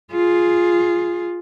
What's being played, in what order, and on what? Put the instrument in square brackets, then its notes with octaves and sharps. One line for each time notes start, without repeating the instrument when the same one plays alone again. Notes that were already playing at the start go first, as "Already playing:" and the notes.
[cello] F4 G#4